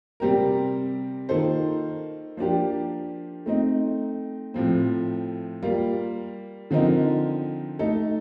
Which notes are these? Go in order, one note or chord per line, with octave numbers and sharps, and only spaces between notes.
C3 G3 C4 G4 A#4
D#3 A#3 F4 A4 C5
F3 A#3 D4 G4
A3 C4 D#4
A2 F3 C4
G3 A#3 F4
D3 F3 C4 D#4 A#4
A3 D#4 A4